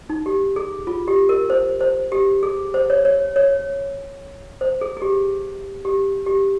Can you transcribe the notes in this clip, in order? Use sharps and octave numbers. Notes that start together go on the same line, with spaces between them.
D#4
G4
G#4
F4
G4
A#4
C5
C5
G4
G#4
C5
C#5
C#5
C#5
C5
G#4
G#4
G4
G4
G4